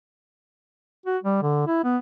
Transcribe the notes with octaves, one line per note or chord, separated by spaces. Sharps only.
F#4
G3
D3
E4
B3